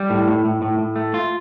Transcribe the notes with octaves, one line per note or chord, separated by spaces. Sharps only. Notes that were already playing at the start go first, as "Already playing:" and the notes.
Already playing: G3
A2
A2
A2
A2
A2
A3
F4